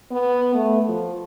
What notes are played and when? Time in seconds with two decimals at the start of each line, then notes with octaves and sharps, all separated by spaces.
0.11 B3
0.54 A3
0.89 F3